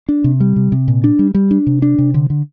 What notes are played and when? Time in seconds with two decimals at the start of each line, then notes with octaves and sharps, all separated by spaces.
0.09 D4
0.24 C3
0.40 G3
0.56 C3
0.72 C3
0.88 A#2
1.04 D4
1.19 G3
1.35 G3
1.51 D4
1.67 C3
1.82 D4
1.98 C3
2.14 D3
2.30 D3